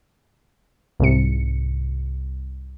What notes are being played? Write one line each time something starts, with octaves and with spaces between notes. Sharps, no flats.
C2 G#2 C3 C#7